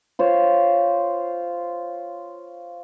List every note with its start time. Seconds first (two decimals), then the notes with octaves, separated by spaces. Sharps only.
0.19 F4 C5 C#5